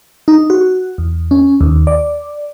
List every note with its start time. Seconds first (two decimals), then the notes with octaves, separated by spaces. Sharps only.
0.28 D#4
0.50 F#4
0.98 E2
1.31 C#4
1.61 D#2
1.87 D5